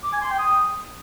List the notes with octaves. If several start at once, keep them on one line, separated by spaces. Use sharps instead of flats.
D6
G#5
C6
G5
D#6